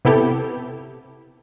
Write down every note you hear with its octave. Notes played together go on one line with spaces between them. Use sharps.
C3 B3 E4 G4 A4